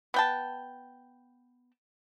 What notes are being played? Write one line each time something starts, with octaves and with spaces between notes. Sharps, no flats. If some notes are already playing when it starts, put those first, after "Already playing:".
B3 G5 A5